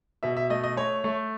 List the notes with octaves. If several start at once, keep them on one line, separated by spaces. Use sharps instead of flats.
B2 E5
E5
A3 D#5
D#5
A3 C#5
A3